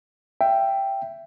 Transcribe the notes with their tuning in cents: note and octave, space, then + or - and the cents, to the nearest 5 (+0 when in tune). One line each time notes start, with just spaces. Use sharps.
E5 +20 G5 +0